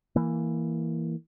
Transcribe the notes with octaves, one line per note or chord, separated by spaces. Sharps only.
E3 A#3